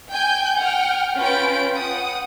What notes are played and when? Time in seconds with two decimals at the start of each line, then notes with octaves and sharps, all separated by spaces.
0.11 G5 G#5 G6
0.58 F#5 G5 F6
1.17 C#4 F4 B4 G5 D7
1.76 F#5 D#6